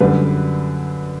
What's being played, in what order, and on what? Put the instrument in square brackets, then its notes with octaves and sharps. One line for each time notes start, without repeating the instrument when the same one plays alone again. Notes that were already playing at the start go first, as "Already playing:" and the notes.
[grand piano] F#2 D3 G3 B4